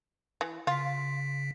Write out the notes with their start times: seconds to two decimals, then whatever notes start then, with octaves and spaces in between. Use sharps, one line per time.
0.41 E3
0.67 C#3 F4 B6